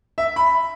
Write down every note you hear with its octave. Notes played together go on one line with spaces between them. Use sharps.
E5
B5